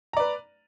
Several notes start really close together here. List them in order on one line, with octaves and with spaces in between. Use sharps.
A#5 D5 B4